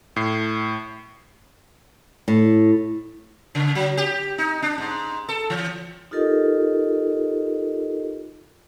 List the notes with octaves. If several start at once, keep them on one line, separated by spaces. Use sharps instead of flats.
A2 C7
A2
C#3
F#3
G4
D#4
D4
G#2
A4
E3
D#4 F4 G4 A4 A#4 D#5